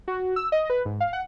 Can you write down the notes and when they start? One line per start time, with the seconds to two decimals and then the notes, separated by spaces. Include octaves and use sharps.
0.08 F#4
0.36 E6
0.52 D#5
0.70 B4
0.85 G#2
1.00 F5
1.13 F#5